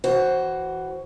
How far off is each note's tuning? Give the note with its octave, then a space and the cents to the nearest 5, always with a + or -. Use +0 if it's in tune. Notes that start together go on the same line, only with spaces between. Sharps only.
E3 +0 F#4 +10 C5 +20